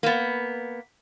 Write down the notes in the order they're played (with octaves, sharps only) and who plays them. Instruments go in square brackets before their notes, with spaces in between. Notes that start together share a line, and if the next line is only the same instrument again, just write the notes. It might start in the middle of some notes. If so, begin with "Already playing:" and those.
[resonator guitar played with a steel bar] A#3 B3